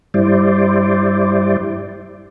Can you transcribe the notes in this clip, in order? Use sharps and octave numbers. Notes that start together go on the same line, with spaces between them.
G2 G3 E4 C5 D5